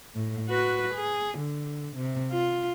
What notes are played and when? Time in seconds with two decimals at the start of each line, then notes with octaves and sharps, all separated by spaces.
0.15 A2
0.49 F#4 B4
0.94 G#4
1.38 D3
1.96 C3
2.32 F4